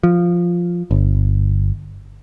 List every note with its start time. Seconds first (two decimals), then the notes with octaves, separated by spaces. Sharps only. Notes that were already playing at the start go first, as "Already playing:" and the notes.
0.03 F3
0.91 G1